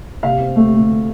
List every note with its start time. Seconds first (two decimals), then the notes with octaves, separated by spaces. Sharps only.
0.23 C3 F5
0.40 C4
0.56 A3
0.73 D2